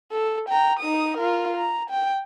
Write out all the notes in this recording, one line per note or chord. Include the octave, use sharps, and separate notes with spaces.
A4
G5 A#5
D#4 D#6
F4 A#4
A#5
G5